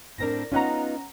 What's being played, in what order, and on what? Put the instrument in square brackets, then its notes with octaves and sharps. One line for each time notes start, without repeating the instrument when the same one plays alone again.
[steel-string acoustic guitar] A2 C4 D4 [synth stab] A#4 A#6
[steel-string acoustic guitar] B3 D#4 F4 [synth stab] C#4 F#5 A#5